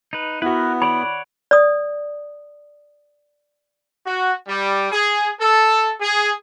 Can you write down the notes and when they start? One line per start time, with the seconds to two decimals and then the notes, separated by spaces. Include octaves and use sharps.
0.13 D#4 B4
0.42 B3 E4 F#4 A#4 B4
0.82 C#5 D5 F#5 B5
1.51 D5 D#6
4.07 F#4
4.48 G3
4.92 G#4
5.40 A4
6.01 G#4